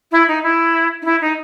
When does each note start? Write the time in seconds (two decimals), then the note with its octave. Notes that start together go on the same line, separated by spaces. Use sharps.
0.12 E4
0.28 D#4
0.43 E4
1.02 D#4
1.05 E4
1.21 D#4